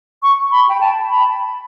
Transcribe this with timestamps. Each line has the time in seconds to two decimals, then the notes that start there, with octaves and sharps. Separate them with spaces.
0.23 C#6
0.52 B5
0.69 G5
0.81 A5
1.10 B5